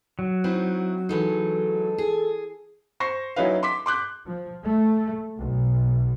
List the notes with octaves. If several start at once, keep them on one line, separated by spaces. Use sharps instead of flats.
F#3
C4 D#4 E4
E3 G#3 D#4 A4
G#4
C5 C#6 A#6 C7
F#3 C#4 D#4 E4 B4 F5
C6 D6 B6
C6 D6 F#6 G6
F3
A3
B1